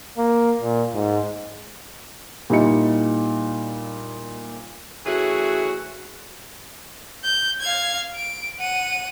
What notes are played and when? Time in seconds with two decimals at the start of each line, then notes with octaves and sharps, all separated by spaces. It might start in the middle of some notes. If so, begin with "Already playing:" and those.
0.18 A#3
0.61 A#2
0.94 G#2
2.50 A#2 G3 D#4 E4 C#7
5.05 E3 A3 C#4 F#4 G#4
7.24 G6
7.61 F5 G#6
8.15 D7
8.59 F#5 D#7